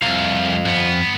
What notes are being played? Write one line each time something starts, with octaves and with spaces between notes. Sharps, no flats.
C2 F2 F5
G2 B3